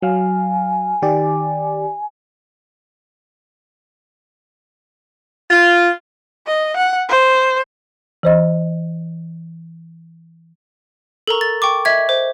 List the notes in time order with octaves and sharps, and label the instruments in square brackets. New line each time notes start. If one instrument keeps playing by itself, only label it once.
[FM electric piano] F#3 F5 [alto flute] G#5
[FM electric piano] D#3 G4 D5
[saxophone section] F4
[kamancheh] D#5
F#5
C5
[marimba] E3 C5 D#5
[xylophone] A4 A#4 A#5 C#6
A6
G5 C#6 D6
D#5 E5 G#6
C5